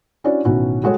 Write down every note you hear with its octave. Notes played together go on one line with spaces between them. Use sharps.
C#4 D4 E4 F#4 C#5 D5
A1 B2 D#3 C#4 E4 F#4
G3 G#3 F#4 A4 C#5